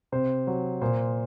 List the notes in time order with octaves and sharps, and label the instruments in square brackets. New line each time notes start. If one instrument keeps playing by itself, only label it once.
[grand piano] C3 C5
F#3
A#2 C5